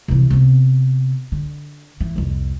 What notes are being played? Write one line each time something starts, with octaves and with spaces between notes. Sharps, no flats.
C3 E3
C3 B3
D3
E3
C2 F2